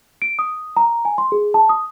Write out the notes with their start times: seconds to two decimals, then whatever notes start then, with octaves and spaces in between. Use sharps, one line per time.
0.22 D7
0.39 D#6
0.77 A#5
1.05 G#5
1.18 C6
1.32 G#4
1.54 A5
1.69 D#6